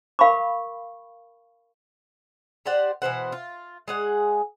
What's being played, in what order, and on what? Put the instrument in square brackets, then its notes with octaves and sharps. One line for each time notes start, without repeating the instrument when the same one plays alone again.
[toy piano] A#4 F5 B5 C#6 D6
[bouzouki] G4 C5 D5 F#5
B2 E3 C5 F#5
F4
G#3 G#4 F#5